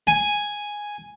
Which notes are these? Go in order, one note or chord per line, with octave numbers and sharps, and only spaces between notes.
G#5